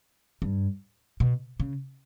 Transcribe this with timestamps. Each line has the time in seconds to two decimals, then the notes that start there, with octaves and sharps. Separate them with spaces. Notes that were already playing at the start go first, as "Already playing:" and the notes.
0.42 G2
1.20 B2
1.60 C#3